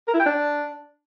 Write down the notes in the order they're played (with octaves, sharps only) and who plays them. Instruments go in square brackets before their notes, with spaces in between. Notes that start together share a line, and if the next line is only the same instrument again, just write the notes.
[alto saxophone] A#4
E4
G5
D4